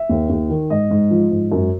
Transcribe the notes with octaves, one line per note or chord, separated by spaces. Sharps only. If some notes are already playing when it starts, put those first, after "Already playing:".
Already playing: E5
D#2
D#2
D#3
G#2 D#5
G#2
F3
G#2
F#2